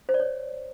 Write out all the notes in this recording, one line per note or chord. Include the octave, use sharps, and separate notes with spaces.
C5
D5
C#5